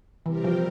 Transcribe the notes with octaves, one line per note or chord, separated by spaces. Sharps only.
C3 E3 G3 C4 G4 A#4
F3